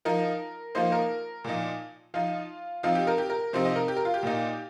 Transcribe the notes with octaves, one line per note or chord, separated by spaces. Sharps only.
F3 D#4 A#4
F3 A#3 D#4 C5
A#4
A#2 F3 D#4
F3 D#4 F4
F3 C4 D#4 F4
G4
A#4
G4
A#4
C3 F3 C4 D#4 C5
D#5
A#4
G4
A#4
F4
G4
A#2 A#3 D#4